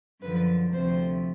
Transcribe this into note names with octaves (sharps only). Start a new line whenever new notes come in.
F#2 D3 F3 B4
D2 C3 F3 C5